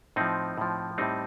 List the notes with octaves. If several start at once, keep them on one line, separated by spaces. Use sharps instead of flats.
A2 F3 C4 D#4
A2 F3
A2 G3 C4 D#4